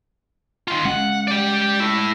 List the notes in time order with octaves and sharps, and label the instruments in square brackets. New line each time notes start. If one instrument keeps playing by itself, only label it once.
[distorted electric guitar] D#3 F4
[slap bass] G#3 C#4 [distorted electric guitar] F#5
[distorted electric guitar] G4 D5
A3 E4